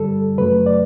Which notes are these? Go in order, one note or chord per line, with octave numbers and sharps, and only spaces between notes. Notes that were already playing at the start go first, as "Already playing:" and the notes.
Already playing: G2 D3 G3 A4
F#2 C#3 F#3 A3 B4
D5